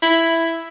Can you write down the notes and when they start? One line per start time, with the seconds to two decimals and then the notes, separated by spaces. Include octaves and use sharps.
0.03 E4